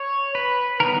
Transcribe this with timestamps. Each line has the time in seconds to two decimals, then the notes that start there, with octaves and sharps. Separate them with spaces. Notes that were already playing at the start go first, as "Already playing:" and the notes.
Already playing: C#5
0.35 B4
0.80 D#3 G3 B3 A#4